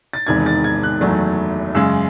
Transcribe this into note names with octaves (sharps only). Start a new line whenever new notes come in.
A6
E1 E2 C3 D#3 G#6
A6
G#6
F#6
F#1 E2 D#3 F#3 A3
F#2 C#3 G#3 E6